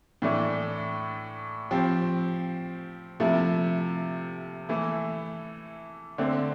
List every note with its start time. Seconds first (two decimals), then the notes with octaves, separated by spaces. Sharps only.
0.22 A2 E3 A3 D4
1.71 F3 C4 G4
3.20 C3 F3 A3 E4
4.69 E3 A3 E4
6.18 D3 A3 C4